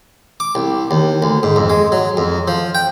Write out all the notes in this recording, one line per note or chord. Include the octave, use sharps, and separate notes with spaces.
D6
C2
D#2
D2
G#2
F2
G#3
F#3
F2
F3
G5